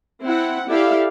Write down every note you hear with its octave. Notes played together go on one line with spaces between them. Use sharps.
C4 E4 F#5
E4 G4 A4 D5 E5 F5